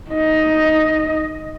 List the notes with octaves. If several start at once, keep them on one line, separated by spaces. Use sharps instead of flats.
D#4 D#5